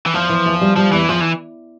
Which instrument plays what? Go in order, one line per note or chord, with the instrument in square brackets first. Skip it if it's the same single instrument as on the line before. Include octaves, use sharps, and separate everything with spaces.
[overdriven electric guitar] E3
[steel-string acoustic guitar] E2 [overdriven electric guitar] F3
[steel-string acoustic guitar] E3
E2
G3
[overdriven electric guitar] F3 [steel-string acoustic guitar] G3
[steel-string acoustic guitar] E2 [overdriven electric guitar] E3
[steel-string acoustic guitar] E2 [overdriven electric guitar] F3
[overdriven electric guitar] E3